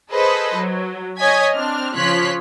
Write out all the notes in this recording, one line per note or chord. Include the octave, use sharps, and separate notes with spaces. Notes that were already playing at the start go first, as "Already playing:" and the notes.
G#4 A4 B4 C5 D#5
F#3
C#5 D#5 G#5 G#6 B6
C4 D4 F6
C#3 F3 C#5 C6 F#6 B6